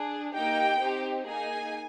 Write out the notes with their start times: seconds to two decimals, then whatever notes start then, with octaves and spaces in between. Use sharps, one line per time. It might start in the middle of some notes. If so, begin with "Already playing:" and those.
Already playing: D4 G#4
0.33 A#3 D#4 G4 G5
0.80 C4 D#4 G4
1.26 A#3 D#4 G#4 G#5